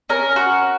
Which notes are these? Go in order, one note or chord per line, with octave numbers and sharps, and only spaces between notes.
C#4 A#4
F#4